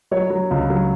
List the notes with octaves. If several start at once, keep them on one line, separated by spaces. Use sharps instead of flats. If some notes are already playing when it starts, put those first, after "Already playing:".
F#3 C#5
F#3
C#2
F#3